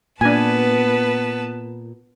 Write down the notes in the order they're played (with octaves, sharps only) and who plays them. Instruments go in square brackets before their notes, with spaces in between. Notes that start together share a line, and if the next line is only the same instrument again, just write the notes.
[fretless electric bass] A#2 [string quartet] B3 B4 A5 [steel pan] D4 G#5